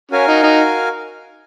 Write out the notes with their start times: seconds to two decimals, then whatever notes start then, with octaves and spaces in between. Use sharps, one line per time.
0.11 C#4 F#4 A#4 F5 G#5
0.28 D#4
0.43 D#4